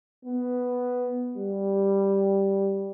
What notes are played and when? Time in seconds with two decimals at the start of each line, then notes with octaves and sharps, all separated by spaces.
0.25 B3
1.36 G3